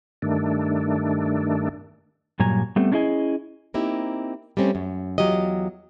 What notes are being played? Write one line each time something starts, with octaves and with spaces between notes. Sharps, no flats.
G2 D#3 A3 D4
G2 A#2 F#3 G#5 A#5
G3 A3 B3 C4
C#4 D4 E4 G#4 D#5 G#5
A#3 C4 D#4 E4 G4
G3 A3 C4 C#4
F#2
E2 C3 F#3 F4 G4 D#5